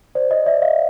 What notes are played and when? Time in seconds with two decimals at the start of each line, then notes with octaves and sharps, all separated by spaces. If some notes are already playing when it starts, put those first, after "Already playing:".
0.15 C5 D5
0.31 C#5 D#5
0.46 D5 E5
0.62 D#5 F5